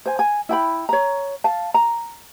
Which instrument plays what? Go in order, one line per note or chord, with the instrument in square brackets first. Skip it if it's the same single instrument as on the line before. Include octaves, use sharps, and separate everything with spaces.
[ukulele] C5 G#5
G#5
E4 G5 B5
C#5 A#5
F5 A5
A#5